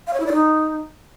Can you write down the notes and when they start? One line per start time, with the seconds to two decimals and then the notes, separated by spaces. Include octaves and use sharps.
0.07 F5
0.13 C#5
0.20 E4
0.26 D5
0.33 D#4